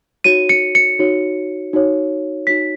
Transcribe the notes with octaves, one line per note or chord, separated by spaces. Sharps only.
D#4 F#4 C#5 D#7
C#7
C#7
D#4 F#4 C#5
D#4 F#4 C#5
D#4 F#4 C#5 B6